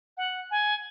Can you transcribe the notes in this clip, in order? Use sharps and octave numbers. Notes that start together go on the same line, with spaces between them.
F#5
G#5